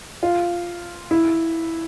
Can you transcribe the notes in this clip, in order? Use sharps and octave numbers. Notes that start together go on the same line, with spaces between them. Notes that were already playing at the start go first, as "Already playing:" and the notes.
F4
E4